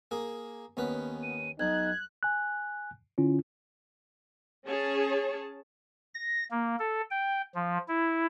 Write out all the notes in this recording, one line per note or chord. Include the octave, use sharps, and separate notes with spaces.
A#3 G#4
D#2 B3 C#4 B4
D#7
B1 D#4 F#6 G#6
G#5 F#6
D3 C#4 E4 F4
C#4 G#4 C#5 A5
A#6
A#3
A4
G5
F3
E4